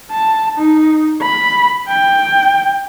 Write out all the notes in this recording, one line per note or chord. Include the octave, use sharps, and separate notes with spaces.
A5
D#4
B5
G5